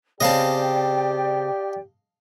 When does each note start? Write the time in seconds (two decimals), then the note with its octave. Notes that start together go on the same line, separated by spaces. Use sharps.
0.21 C#3 C4 G4 D5 D#5 F5 G5 A5